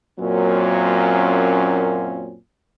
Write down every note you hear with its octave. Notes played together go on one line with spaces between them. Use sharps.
F#2 A#2 F#3 A#3 C4 C#4